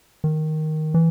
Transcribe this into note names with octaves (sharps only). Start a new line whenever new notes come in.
D#3
E3